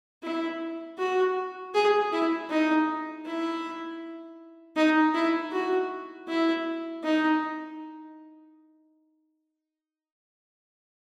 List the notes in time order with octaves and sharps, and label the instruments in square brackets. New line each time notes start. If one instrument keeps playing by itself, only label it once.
[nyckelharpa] E4
F#4
G#4
E4
D#4
E4
D#4
E4
F#4
E4
D#4